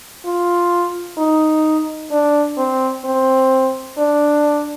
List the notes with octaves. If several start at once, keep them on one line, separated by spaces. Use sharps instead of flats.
F4
D#4
D4
C4
C4
D4